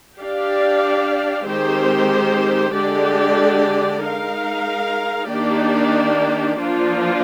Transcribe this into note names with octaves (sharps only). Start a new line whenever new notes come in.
D4 G4 D5 F5
D#3 G#3 C4 G4 C5
D3 G#3 D4 G4 D5
G#3 D#4 A#4 F5
D#3 A#3 D4 G4 D5
F3 A#3 D4 F4